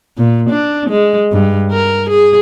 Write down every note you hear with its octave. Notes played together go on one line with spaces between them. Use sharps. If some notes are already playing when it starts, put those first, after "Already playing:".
A#2
D4
G#3
G2
A#4
G#4